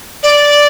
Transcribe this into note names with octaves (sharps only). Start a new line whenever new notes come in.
D5